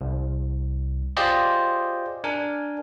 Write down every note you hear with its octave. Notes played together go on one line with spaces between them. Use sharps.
C2
F4 G4 G#4 C5 D5 D#5
D4 A#4 G#5